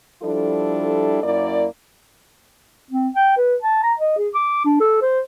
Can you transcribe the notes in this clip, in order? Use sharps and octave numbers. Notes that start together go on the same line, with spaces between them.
F3 G3 D4 E4 A4
F#2 A#3 E4 D5
C4
G5
B4
A5
A#5
D#5
G#4
D6
D4
A4
C5